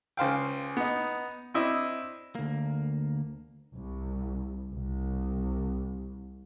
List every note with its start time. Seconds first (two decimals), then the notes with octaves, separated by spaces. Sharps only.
0.17 C#2 C5 F5 G5
0.77 B3 D#4
1.54 C4 D4 E4 D#5
2.35 D2 A#3
3.75 C2
4.72 C2